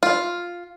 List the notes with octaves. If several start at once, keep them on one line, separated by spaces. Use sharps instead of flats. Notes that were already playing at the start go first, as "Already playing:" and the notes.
F4